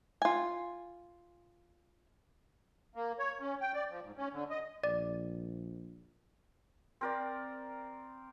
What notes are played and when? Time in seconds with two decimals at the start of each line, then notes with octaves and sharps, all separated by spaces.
0.22 F4 G#5
2.95 A#3
3.19 C#5
3.40 C#4
3.61 G5
3.74 D5
3.90 F3
4.03 G#2
4.17 C#4
4.33 D3
4.50 D#5
4.84 A#1 D5
7.01 C4 A#4 D5